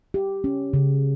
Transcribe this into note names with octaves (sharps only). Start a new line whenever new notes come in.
G4
C#4
C#3